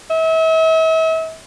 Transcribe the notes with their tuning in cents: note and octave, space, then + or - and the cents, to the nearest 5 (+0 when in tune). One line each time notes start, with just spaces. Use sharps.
E5 -40